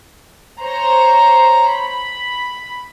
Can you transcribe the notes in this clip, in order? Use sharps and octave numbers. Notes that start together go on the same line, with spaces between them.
C5 C#5 A#5 C6
B5